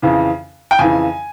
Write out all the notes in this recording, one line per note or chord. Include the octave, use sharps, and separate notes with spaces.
F2 C#3 E3
G5
F2 C#3 E3 G#5